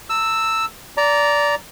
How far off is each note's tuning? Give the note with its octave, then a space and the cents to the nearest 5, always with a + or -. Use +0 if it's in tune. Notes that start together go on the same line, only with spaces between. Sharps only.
A#5 -45 E6 +0
D5 -15 A#5 +0